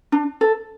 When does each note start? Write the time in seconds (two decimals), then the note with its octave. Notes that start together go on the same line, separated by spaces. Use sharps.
0.12 D4
0.41 A4